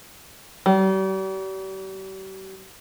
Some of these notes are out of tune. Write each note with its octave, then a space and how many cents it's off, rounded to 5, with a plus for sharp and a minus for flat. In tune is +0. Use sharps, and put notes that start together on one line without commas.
G3 -40